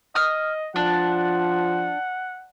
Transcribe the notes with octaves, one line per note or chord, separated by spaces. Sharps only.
D#5 D#6 F6
F3 D4 F#5